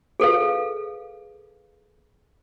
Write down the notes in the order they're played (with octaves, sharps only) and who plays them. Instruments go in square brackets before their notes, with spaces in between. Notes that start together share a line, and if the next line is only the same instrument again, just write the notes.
[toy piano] G#4 A4 B4 F5